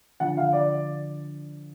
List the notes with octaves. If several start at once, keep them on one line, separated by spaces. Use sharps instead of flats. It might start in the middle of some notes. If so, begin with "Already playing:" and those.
D3 F3 F#5
F5
D5